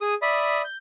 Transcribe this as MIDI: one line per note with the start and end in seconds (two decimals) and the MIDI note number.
0.01 0.14 68
0.01 0.14 87
0.22 0.62 74
0.22 0.62 76
0.22 0.62 83
0.22 0.62 87
0.65 0.77 91